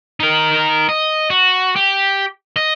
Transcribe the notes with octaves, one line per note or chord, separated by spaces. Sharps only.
D#4 A#4
D#5
F#4
G4
D#5